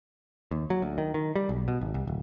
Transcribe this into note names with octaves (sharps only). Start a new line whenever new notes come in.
D#2
F#3
D2
D#3
D#3
G3
B1
B2
G#1
C2
D1